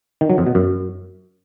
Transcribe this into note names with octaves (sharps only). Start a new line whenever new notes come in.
D#3
F#3
F2
B2
F#2